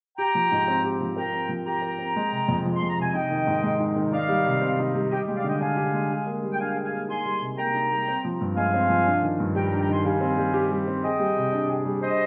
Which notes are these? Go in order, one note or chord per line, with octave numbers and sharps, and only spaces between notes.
G4 G5 A#5
F3
G#2
C4
G4
F3
A#4 G5 A#5
C4
F3
G4 G5 A#5
A#4
C4
G#3
C3
F2
F3
C6
G#3
A#5
C3 G#5
D#4 D#5 G5
D#3
G#2
G#3
D#4
D#3
D#4 D5 F5
G3
C3
C4
D#4
G3
G4 D#5 G5
G#3
D5 F5
D3 D#5 G5
D4 F5 G#5
G4
G#3
G#4
A#3
G3
G5
D4 F5 G#5
G#4
F5 G#5
A#3
D#4 G#5 C6
G3
C3
A#3 G5 A#5
D#4
G3
C4
F3
G2
G#3 F5 G#5
C4
F3
D4
D#3
G2
G3 G5 A#5
G5 A#5
D4
G5 A#5
D#3 G#5 C6
G3 F5 G#5
C4
G3
G4
G3
C4
G#4 D#5 G5
G3
C3
D4
G#4
G3
D4 C5 D#5